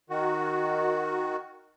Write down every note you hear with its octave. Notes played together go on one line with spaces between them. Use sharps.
D#3 F#4